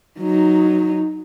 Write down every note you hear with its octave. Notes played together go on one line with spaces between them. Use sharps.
F#3 D#4